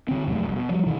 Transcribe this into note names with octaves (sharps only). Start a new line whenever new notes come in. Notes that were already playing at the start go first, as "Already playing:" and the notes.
D3 C4
F2 B2 F#3 A3
F1 C2
B2
F3 G3
B2 D#3 E3